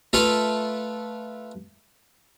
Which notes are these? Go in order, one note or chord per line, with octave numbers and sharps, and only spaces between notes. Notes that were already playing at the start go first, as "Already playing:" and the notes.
A3 F4 A4 B4 F5